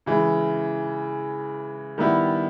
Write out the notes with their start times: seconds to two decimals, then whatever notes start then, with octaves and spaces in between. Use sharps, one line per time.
0.06 C#3 E3 G#3
1.98 D#3 G3 B3 E4